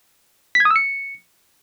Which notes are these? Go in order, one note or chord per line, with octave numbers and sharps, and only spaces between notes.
B6
G#6
D#6
E6
C#7